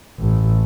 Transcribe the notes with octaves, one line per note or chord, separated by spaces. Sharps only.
A1